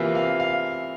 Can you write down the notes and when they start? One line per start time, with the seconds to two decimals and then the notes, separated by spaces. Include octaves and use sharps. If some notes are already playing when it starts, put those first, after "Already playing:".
Already playing: C3 E3 A#3 F4 E5
0.15 F5
0.40 F5